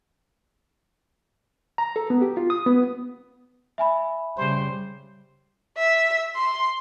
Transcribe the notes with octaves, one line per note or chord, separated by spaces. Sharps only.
A#5
A4
B3
G4
F4
D#6
B3
E5 G#5 B5
C#3 G3 C5
E5
C6